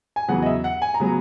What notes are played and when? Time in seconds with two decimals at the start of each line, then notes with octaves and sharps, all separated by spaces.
0.16 G#5
0.28 E2 C#3 F#3 B3 F#5
0.42 D#5
0.46 E5
0.64 F#5
0.82 G#5
0.94 A#5
1.00 C#3 F#3 B3